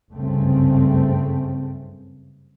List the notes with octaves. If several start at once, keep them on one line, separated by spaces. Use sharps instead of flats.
F#1 C2 G2 C#3 A3 C4